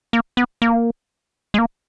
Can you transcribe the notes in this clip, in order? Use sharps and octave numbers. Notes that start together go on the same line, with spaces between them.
A#3
B3
A#3
G#3
A#3